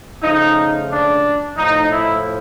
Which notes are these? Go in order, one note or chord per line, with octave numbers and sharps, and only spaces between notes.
C#3 F3 A3 D#4
D4
A2 F3 A3 D#4
E4